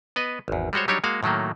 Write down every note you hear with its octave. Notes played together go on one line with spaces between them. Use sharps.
B3 B4 D#5
G#1 E2
G3 G#3 F#4 C5 C#5
F#3 G3 D4 D#4 G4 C#5
G#3 A#3 F#4 F5
A2 D#3 F#3 A3 A#3